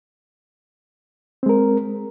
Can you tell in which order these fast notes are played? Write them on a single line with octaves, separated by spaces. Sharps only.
C4 G#3 A#4